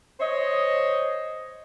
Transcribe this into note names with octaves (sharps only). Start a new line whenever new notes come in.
C5 C#5 D#5